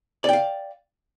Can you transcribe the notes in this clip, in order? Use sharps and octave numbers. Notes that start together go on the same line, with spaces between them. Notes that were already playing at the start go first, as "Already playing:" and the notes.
D5 F5 G5